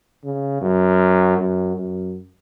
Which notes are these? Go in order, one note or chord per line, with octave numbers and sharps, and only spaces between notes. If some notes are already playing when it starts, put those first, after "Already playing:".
C#3
F#2
F#2
F#2